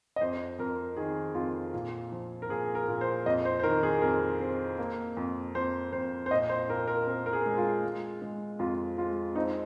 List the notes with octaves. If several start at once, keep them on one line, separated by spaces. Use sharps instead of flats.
D#5
F2 C5
F2 A#4
D#3 G#4
F2 F4
A#2
F3
A#4
A#2 G#4
A#4
A#2
C5
F2 D#5
C5
C5
D#3 A#4
G#4
F2 A#4
C4
A#3
F2
F2 C5
F2 C5
C5
A#2 D#5
C5
A#2 A#4
A#4
C4 A#4
A#4
G#4
G#3
G#4
F4
G#3
G#3
F2 F4
G#3 F4
C4 D#4